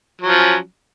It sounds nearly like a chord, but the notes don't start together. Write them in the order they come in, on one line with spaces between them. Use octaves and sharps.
F#3 F3 C#4